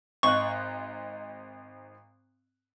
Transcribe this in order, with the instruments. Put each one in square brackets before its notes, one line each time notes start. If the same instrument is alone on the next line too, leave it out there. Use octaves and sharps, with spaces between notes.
[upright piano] G#1 D#4 F#6 [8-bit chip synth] C#6